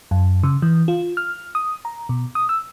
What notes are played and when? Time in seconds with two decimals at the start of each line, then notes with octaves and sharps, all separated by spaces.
0.11 F#2
0.43 C#3
0.62 E3
0.88 F4
1.17 F6
1.55 D#6
1.85 A#5
2.09 B2
2.35 D#6
2.49 E6